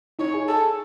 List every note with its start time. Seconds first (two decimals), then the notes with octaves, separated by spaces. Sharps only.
0.19 D#4 C#5
0.34 G#4
0.48 A4